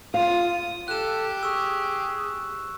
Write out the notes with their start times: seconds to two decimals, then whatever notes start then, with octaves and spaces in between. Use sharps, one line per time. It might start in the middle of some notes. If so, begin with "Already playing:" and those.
0.14 F4 F5 D#6
0.88 G4 A4 F#6 E7
1.43 G#4 C#6 E6